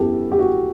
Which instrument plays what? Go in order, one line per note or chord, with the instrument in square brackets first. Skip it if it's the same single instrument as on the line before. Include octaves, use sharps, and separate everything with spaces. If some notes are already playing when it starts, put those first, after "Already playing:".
Already playing: [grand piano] F#2 E3 B3 G4 A4
G4
F#4